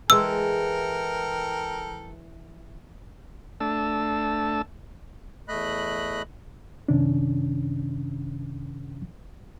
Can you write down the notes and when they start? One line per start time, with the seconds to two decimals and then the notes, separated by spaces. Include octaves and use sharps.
0.10 E3 G#3 A4 A#4 G5 E6
3.60 A3 D4 A5 E6
5.48 E2 A3 D#5 B5 F#6
6.88 F#2 C3 D#3 C#4 D4